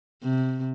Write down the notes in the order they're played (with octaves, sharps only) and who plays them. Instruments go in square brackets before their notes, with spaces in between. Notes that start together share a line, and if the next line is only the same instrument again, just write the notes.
[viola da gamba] C3